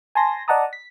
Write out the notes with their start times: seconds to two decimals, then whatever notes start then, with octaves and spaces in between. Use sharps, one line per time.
0.15 G#5 A5 C6 A#6
0.48 D5 D#5 F#5 A5 A#5 D#6
0.73 B6